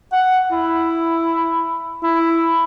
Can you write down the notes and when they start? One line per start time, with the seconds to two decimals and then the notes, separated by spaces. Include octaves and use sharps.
0.13 F#5
0.52 E4
2.03 E4